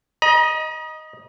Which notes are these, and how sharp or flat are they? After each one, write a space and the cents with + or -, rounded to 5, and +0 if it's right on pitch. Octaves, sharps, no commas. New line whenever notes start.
D#5 +0 A#5 +45